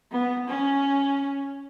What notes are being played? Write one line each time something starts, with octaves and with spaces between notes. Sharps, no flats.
B3
C#4